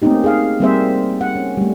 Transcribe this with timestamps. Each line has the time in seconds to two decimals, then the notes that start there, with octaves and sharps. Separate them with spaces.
0.02 A3 A#3 C4 C#4 D#4 G4
0.24 G#4 F5
0.60 G3 A#3 C4 G#4 C5 E5
1.21 F#5
1.36 C#4
1.57 G3 A3